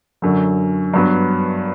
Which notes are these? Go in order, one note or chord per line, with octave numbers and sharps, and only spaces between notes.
F#2 D3 F#3
G2 F#3 B3